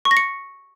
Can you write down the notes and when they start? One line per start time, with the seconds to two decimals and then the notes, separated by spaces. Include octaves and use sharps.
0.05 C#6
0.11 A#6
0.17 C#7